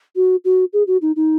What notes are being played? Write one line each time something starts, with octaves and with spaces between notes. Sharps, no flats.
F#4
F#4
G#4
F#4
D#4
D#4